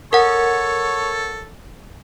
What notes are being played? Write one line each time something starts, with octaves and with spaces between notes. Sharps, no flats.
A4 A#4 C#5 F#5